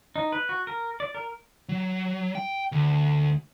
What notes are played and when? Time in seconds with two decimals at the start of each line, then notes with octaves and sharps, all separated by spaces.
0.16 D#4
0.32 B4
0.49 F#4
0.67 A#4
1.00 D5
1.15 A#4
1.69 F#3
2.35 G5
2.72 D2